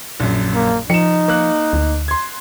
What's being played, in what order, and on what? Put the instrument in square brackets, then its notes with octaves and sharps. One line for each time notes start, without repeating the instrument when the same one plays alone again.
[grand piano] A#1 F#2
[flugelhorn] A#3
[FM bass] F3 [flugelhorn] D#4 [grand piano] C#7 E7
[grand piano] A#3 F#6
[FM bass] D2
[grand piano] C6 G#6